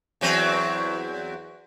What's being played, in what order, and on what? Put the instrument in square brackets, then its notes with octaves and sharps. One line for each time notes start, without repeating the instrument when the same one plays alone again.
[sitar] E2 F#3 C4